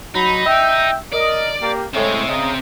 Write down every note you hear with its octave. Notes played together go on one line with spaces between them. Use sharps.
F#3 D#4 B5
E5 G5
A#4 D5 D#5
A#3 G4
A2 G#3 C4 C#5 E5
C#3 D#5 A#5